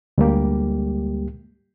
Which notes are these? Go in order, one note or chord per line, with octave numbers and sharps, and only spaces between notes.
D2 G3 G#3 A#3 G4